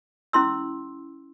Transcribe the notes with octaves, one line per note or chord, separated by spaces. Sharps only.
C#4 E4 C6 E6